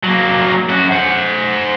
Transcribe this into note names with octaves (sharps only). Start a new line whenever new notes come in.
F#3 A#3
F#2 F#4
C5 F#5